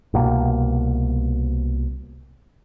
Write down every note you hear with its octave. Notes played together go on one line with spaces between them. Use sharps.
C2 B2 A#3